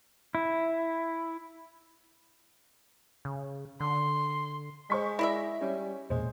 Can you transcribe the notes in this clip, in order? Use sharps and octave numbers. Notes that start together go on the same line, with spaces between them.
E4
C#3
D3 C6
G#3 C5 C#6 B6
E4 D5 E5 A#6
G3 C#4
E1 A#2 G#3 C5